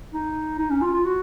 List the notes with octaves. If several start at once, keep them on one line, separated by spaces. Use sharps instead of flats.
D#4
D#4
C#4
F4
F4
F#4